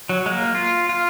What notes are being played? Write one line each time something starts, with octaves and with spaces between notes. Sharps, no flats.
F#3
G#3
A#3
F4
F4